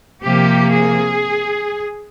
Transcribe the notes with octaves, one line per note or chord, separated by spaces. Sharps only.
C3 F3 A#3 G4
G#4